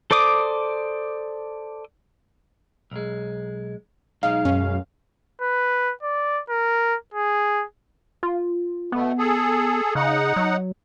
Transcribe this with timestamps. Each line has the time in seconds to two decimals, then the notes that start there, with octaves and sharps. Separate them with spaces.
0.11 A4 C5 D5 D6 D#6
2.91 B1 G#3
4.23 B1 G#3 D#4 F5
4.45 F#2 C#4
5.42 B4
6.03 D5
6.49 A#4
7.14 G#4
8.23 F4
8.92 B2 A3 B3
9.18 G#4 A4
9.95 C#3 D#4 F#5
10.36 F#3